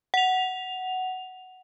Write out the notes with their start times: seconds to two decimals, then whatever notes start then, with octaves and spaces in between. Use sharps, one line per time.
0.14 F#5 F7